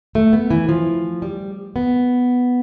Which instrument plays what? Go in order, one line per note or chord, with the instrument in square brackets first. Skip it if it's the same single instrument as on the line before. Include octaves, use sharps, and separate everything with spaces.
[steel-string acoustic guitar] A3
B3
E3
F3
G3
B3